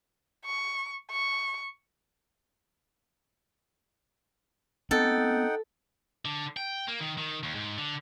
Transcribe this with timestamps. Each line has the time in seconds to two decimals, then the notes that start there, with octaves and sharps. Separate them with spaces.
0.45 C#6
1.11 C#6
4.91 B3 C4 D#4 A4 F#5 G5
6.25 D3
6.57 G5
6.88 A#3
7.01 D#3
7.18 D#3
7.43 D#2
7.55 G#2
7.78 D3